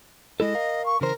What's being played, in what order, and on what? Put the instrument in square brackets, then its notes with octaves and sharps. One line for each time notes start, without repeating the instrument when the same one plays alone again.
[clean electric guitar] G#3 E4 A4 [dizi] D#5
[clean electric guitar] A#4 F5
[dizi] C#6
[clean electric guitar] C#3 E3 C5 [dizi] A#4